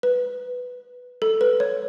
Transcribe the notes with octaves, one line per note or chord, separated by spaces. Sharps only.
B4
A4
B4
C#5